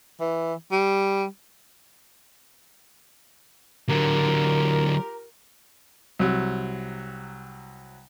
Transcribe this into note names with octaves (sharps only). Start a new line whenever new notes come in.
E3
G3
D3 F#3 F4 G4 A#4
C2 F#3